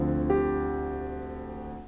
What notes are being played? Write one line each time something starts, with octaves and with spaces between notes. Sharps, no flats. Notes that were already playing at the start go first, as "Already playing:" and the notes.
Already playing: D2 D3 F3 C4
G4